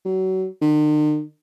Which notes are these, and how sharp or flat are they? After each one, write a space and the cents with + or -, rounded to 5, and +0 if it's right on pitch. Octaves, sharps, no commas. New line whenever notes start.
F#3 +30
D#3 -45